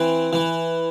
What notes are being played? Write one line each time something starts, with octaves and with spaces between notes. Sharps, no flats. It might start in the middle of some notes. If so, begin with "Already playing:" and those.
Already playing: E3 C4
E3